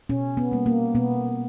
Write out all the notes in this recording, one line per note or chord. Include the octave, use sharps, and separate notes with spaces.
B2 C#4
B3
G3 A#3
A#3
B2 B3